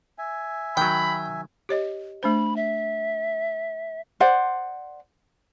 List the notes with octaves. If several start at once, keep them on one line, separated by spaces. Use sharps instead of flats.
E5 G#5
D#3 F#3 G5 B5
G4 C#5 D#5
A3 D4 C5 B5
E5
C5 D5 F#5